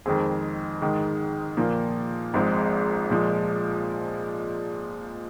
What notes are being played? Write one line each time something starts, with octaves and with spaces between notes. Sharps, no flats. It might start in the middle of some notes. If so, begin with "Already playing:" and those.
F2 D#3 G#3 C4 G#4
G#2 D#3 G#3
A#2 F3 A#3
G#1 G#2 F3 G#3 C4
A#2 F3 G#3